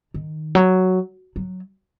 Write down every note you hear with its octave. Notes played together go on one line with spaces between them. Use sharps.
D#3
F#3
F#3